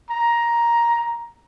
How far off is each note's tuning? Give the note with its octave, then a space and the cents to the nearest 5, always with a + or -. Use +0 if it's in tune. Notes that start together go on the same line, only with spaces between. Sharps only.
A#5 +10